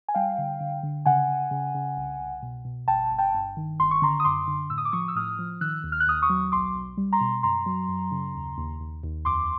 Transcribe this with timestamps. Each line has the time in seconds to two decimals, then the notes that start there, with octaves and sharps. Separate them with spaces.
0.09 G#5
0.14 G3 F5 G5
0.38 D3
0.61 D3
0.83 D3
1.06 C#3 F#5 G#5
1.28 C#3
1.51 C#3
1.75 C#3
1.97 C2
2.20 C2
2.42 B2
2.65 B2
2.88 G1 G5 A5
3.11 G1
3.18 G5 A5
3.34 G2
3.57 D#3
3.80 G1 C6
3.91 C#6
4.02 D3 A#5 C6
4.20 D#6
4.25 F#2 C6 D6
4.48 D3
4.70 A2 E6
4.78 D#6
4.85 D6
4.92 F3 C#6 D#6
5.08 E6
5.15 A2 D#6 F6
5.39 F3
5.61 D#3 E6 F#6
5.84 D#2
5.92 F6
6.00 F#6
6.07 D#2 D#6 F6
6.22 C#6 D#6
6.30 F#3
6.52 B1 C6 D6
6.75 B1
6.97 G3
7.13 A#5 C6
7.21 B2
7.43 F#2 A#5 C6
7.66 F#3
7.89 F#2
8.11 C#3
8.35 D#2
8.58 D#2
8.80 D#2
9.03 D#2
9.25 F2 C6 D6